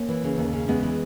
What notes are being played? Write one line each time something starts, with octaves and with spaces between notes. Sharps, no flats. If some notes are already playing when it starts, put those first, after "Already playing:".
Already playing: A#3 C#4
E3
C#3
D#2
C#3
E2 G#3 B3
E3